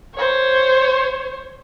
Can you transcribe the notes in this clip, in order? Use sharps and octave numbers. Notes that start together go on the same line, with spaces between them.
C5 C#5